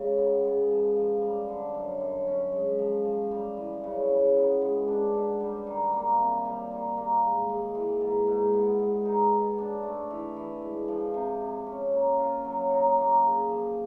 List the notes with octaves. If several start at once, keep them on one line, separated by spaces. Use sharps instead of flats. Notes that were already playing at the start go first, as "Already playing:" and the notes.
Already playing: C#3 G#3
B3
G#3
F3
F3
G3
D3
F#2
F#2
C#4
G#3
F3
F3
G3
E3
C#3
C#3
B3
G#3
D4
B2
G3
D#3
A#3
C3
G3
D#3
A#3
G#2
G#3
E3
G#2
G#2
B3
G#3
D#4
B2
D4
A3
E3
E3
G#3
F3
C3
C3
C#4
A#3
F4
F#3
D#4
A#3
G#4
F3